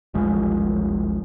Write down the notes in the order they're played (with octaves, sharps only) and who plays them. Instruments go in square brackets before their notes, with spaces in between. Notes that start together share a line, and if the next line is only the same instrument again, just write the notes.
[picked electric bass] D#1 A1 F3 G#3